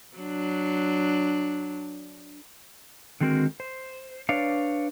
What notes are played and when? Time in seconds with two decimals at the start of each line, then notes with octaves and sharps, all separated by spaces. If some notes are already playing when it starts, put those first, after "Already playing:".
0.17 F#3 D4
3.21 D3 D#3 G#3 C4 F#4 A#4
3.60 C5
4.29 D4 B4 C#5 D5 F5